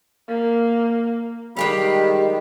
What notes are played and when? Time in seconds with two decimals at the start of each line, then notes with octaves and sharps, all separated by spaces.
0.28 A#3
1.57 D#3 G3 G#3 G4 F5 B5